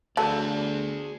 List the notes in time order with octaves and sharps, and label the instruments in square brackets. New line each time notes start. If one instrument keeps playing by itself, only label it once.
[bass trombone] D2 [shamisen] F#3 A4 [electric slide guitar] G#4 D5